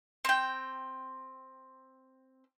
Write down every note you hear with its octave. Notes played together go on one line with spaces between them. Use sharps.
C4 G5